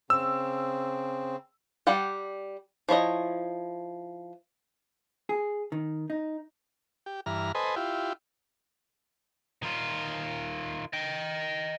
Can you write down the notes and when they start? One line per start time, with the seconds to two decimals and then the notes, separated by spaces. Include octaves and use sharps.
0.10 C#3 C4 E6
1.87 G3 D5 F#5 G5
2.89 F3 E4 C#5 D#5
5.29 G#4
5.72 D#3
6.10 D#4
7.06 G4
7.26 G2 E3 A#5 F6
7.55 A4 B4 C5 D#5 G#5
7.76 E4 F4 G4
9.63 D#3 F4
10.93 D#5 G5